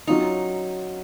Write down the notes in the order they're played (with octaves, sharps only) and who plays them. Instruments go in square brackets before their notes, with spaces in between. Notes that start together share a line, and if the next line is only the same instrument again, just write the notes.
[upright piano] F#3 C#4 F4 [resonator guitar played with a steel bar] D#4